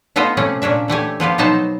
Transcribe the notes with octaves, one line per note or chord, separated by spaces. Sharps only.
A3 B3 F4 A4 D#5
C3 A3 C#4
A#2 C#4 D4 E5
E3 A3 G4 G#5
F3 B3 F4 G4
B2 F#3 B3 D#4 C5 A5